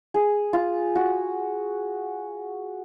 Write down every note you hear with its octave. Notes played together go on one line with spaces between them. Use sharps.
G#4
F4
F#4